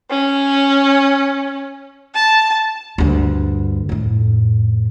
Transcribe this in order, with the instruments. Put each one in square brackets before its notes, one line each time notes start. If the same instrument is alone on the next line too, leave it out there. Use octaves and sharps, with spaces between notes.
[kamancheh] C#4
A5
[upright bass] D2 G2
F2 A2